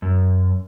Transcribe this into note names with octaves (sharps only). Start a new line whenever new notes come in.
F#2